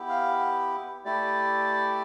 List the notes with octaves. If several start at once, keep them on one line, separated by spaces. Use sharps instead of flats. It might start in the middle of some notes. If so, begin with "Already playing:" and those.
Already playing: B3 E4 G4
F5
A3 E4 G4 D5